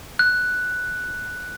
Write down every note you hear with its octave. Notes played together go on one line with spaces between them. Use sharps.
F#6